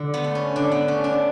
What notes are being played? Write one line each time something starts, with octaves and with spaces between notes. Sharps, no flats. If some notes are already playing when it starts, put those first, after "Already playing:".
Already playing: D3
B3
A3
C#4
D3 D4
B3
A3 C#4
D4